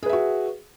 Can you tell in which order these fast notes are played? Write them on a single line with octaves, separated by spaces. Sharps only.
G#4 B4 E5 F#4